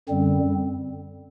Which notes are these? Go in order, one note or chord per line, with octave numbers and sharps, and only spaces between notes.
F#2 D3 G3 C4